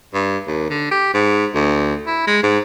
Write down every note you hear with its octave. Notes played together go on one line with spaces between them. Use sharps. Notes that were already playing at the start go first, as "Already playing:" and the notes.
G2
D#2
D3
G4
G#2
D2
E4
G#3
G#2